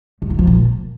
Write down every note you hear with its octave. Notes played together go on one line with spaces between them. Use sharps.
G2
E3
F3
A#2